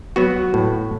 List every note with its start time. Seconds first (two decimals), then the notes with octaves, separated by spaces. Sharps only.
0.16 F#3 B3 F#4
0.54 A2